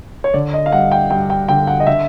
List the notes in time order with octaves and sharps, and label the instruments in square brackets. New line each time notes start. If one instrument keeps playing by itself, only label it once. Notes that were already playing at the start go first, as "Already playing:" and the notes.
[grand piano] C#5
D3 D5
D#5
F5
G2 F#5
G5
G2 G5
G5
D3 G5
F#5
D#5
D3 E5